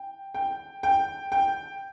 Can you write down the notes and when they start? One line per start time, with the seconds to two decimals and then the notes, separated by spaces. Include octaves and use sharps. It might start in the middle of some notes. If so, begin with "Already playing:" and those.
Already playing: G5
0.34 G5
0.83 G5
1.32 G5